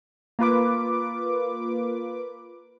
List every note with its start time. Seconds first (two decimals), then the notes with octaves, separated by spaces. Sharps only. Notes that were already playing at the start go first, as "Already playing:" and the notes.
0.39 A#3 F4 B4 D6